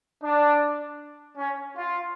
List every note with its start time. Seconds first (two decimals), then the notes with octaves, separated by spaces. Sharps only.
0.23 D4
1.37 C#4
1.75 F4